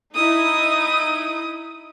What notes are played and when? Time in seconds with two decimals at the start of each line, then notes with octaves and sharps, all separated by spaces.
0.15 D#4 E4 D#6